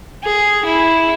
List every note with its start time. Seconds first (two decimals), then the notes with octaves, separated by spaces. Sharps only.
0.24 G#4
0.66 E4